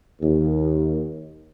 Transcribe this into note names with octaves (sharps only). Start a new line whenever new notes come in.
D#2